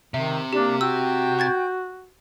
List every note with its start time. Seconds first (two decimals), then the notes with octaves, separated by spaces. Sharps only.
0.14 C3 D#3 E5
0.53 A#3 D4 G4
0.81 F#4 G5 E6 G6
1.39 C#6 G#6 A6